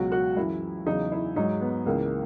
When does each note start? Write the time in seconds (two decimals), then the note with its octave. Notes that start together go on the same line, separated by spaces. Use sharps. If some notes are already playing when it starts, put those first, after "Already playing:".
Already playing: C#2 B2 F#3 F#4
0.12 F#4
0.36 F#2 E3 E4
0.86 E2 C#3 F#3 D#4
1.12 E4
1.36 G#2 F#3 D#4
1.61 B3
1.86 C#2 C#3 E3 A#3